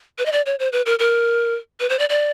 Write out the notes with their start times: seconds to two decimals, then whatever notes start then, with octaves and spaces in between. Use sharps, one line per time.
0.18 B4
0.26 D#5
0.32 D5
0.46 C#5
0.59 C5
0.72 B4
0.86 A#4
0.99 A#4
1.80 B4
1.90 C5
1.99 D5
2.09 D5